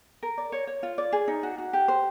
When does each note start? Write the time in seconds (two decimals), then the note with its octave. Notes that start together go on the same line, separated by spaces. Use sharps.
0.23 A#4
0.38 D5
0.52 C#5
0.67 C#5
0.83 F4
0.98 D5
1.13 G#4
1.28 D#4
1.43 F#4
1.58 F#4
1.73 G4
1.88 C5